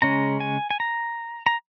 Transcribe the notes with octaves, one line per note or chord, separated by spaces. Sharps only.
C#3 G#3 C#4 A#5
G#5
G#5
A#5
A#5